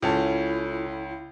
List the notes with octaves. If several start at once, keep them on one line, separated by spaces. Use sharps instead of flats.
C#2 C#4 E4 F4 A4 A5